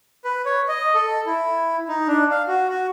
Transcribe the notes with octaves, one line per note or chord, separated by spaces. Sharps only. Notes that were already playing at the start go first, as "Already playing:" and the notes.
B4
C#5
D#5
A4
E4
D#4
D4
F5
F#4
F#4